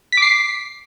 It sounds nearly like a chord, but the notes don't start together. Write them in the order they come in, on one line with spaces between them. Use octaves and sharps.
B6 D6 C7